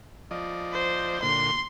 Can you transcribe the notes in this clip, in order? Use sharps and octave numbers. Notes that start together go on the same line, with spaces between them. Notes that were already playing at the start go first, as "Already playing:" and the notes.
F3 D5 D#5
C5
A#2 D3 C6